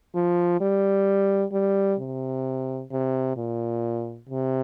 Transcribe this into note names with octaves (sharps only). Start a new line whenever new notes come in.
F3
G3
G3
C3
C3
A#2
C3